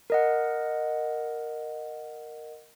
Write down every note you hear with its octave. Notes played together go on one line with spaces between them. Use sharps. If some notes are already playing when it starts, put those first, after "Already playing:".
A#4 D#5 F#5